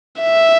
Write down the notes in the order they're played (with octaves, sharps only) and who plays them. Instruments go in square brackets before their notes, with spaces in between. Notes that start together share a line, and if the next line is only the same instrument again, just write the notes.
[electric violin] E5